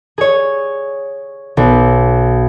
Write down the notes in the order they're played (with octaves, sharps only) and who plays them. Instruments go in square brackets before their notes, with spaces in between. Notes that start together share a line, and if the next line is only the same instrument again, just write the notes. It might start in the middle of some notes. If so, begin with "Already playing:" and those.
[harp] G#4 C#5
B1